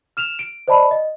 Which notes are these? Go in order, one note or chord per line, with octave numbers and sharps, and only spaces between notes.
F6 E7 F7
D7
C5 D5 D#5 A5 B5
D#5